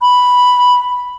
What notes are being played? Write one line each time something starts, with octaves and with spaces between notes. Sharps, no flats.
B5